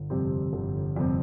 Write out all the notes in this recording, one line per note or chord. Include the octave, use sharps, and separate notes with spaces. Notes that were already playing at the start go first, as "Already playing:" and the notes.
Already playing: G1
F2 C3 G3 C4
G1
F2 C3 G3 C4